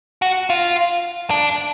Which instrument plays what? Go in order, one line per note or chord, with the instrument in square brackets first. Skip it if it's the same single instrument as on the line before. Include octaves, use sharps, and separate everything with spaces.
[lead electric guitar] F#4
F4
D4